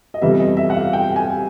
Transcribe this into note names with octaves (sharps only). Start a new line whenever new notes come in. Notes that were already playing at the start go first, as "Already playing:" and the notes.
D#5
F2 C3 E3 G3 B3 E5
D#5
E5
F#5
F5
G5
G5
G#5